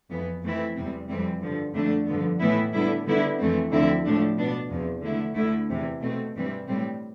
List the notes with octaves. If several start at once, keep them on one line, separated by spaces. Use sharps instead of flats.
F2 E3 B3
F2 E3 A3 C4 E4
E2 C3 G3 C4
F2 E3 G3 C4
G2 D3 F3
F2 D3 A3 D4
G2 D3 F3 B3
A2 E3 B3 E4
D3 G3 B3 E4
D3 G3 B3 E4
F2 E3 A3 C4
D2 D3 F3 C4 E4
A2 F3 A3 D4
B2 B3 D4
E2 C3 F3
D3 A3 E4
D2 D3 A3 E4
E2 C3 E3
B2 A3 C4
G2 E3 G3 C4
A2 G3 C4